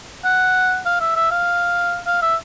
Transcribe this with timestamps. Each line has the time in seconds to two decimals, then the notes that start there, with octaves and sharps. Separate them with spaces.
0.25 F#5
0.86 F5
1.01 E5
1.16 E5
1.31 F5
2.07 F5
2.22 E5